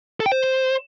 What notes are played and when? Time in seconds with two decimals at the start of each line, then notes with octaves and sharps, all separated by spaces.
0.20 A4
0.26 G5
0.32 C5